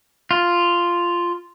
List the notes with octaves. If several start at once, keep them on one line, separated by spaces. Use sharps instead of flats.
F4